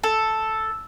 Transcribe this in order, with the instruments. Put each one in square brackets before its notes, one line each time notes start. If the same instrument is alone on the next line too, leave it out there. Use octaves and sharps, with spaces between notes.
[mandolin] A4